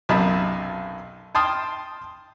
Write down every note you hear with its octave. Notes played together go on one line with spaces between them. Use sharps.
B1 F#2 C3 D#4 A5 B5
G5 A5 C6 D#6 F6